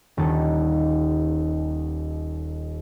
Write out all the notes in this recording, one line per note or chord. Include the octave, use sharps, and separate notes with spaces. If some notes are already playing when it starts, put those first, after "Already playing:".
D#1 D#2 A4